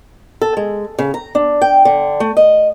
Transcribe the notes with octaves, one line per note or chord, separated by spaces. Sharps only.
A4
G#3
C#3
A#5
D4
G5
D3
A3
D#5